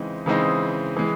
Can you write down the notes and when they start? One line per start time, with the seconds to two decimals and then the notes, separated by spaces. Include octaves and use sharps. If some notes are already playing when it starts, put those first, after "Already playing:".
Already playing: C#3 E3 G#3 C4 D#4
0.26 C#3 E3 G#3 C4 D#4
0.96 E3 G#3